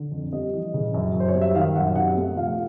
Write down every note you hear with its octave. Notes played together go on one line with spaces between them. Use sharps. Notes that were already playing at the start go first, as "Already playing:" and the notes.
Already playing: D3
F2
G3 D#5
E3
C#3
F#2
F#2
C5
C#5
G3
E5
D#3 F5
F#2 F#5
C3 F#5
A3
F3 F5